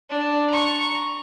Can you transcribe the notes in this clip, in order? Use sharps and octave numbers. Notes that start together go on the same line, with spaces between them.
D4
A#5 C#6